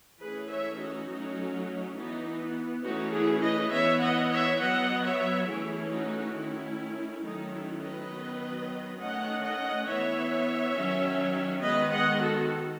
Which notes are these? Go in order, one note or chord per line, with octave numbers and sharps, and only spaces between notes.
E3 A3 C#4 G#4 B4
C#5 E5
D#4 F#4
F#3 A3 C#4
E3 B3 D#4
E3 A3 C#4 D#4 F#4
E4 G#4
B4 D#5
E3 B3 C#5 E5
D#5 F#5
C#5 E5
F#3 B3 D#5 F#5
C#5 E5
E3 A3 C#4 E4 G#4
D#4 F#4
D#3 A3 C#4 E4
D#3 F#3 A3 C#4 D#4
E4
B4 D#5
D#3 F#3 B3
D#3 A3 C#4 D#5 F#5
D#5 F#5
E3 B3 C#5 E5
D#3 F#3 C#4
D#3 G#3 B3 B4 D#5
D#5 F#5
F#4 A4